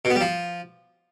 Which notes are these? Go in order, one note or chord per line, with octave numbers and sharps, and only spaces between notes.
B2
B3
G3
F3